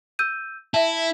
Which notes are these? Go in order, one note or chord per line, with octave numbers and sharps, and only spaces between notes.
E6 G6 D#7
E4 E5 A5